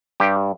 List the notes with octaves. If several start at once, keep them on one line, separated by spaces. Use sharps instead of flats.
G2 G4